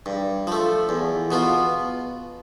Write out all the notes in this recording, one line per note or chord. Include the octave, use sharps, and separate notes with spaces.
G2
F3 A3
E2
B2 B3 F4